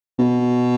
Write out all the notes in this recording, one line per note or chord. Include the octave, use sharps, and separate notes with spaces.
B2